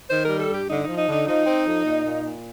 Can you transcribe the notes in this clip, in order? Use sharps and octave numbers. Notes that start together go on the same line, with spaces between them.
D#3 C5
G3 A#4
A4
G2
G4
D3 D#4
F3 D#4
D#4
D3 D#4
F3 D#4
C4
F2
A#2
A#2
A#2